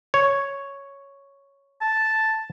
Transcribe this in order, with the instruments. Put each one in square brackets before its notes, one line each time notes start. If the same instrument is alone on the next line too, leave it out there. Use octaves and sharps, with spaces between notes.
[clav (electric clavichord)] C#5
[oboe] A5